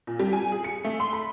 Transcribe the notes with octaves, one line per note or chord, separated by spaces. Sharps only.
A#2
G3
G#5
G#4
C#7
A3
C6
B5